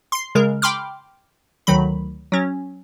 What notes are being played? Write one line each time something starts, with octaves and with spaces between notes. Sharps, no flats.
C6 C7
C#3 G#3 A#4
G5 B5 C6 D6 F6
D2 D#3 F#3 B5
F#3 C#4